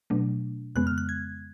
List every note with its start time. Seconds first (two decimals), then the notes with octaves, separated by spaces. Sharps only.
0.10 B2 F#3 A3 D4
0.76 F2 C#3 G#3 B3 F#6
0.87 F6
0.98 F#6
1.09 G#6